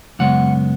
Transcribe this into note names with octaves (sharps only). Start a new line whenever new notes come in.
F#2 C#3 G#3 B3 F#5